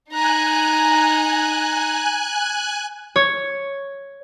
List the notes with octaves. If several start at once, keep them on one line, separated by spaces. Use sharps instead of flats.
D#4 G#5 A#5 F#6
C#5